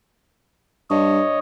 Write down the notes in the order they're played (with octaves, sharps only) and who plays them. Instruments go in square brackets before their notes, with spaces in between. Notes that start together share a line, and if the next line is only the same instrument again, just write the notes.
[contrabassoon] G2 [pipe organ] C#5 D#5